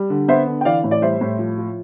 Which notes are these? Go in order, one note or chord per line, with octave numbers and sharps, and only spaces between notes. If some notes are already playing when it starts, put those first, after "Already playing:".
Already playing: G3
D3
B3 C5 E5
D3
G5
E3 D5 F5
A2
D5
G3 C5 E5
A2
F3
F4